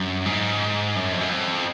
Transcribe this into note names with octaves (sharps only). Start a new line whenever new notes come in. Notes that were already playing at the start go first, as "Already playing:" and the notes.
Already playing: F#2
G#2
F#2
F2
F#2
F2